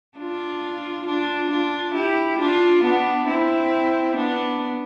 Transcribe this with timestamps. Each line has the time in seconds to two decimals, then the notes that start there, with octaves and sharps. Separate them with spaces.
0.18 D4 F4
1.07 D4 F4
1.51 D4 F4
1.95 E4 G4
2.39 D4 F4
2.83 B3 D4
3.28 C4 E4
4.16 B3 D4